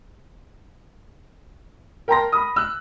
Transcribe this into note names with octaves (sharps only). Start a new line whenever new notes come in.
A#4 G5 A5 A#5 C6 A#6
B5 D#6
E6 F#6